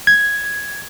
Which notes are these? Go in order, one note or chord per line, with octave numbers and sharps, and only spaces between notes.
G#6